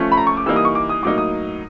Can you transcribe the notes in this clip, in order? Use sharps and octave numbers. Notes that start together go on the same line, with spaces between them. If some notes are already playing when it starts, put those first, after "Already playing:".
Already playing: F3 A3 C#4
B5
A#5
C#6
D6
E3 G3 A#3 D#4 E6
D#6
C#6
D6
D#6
A2 F#3 A#3 D#4 D6
D#6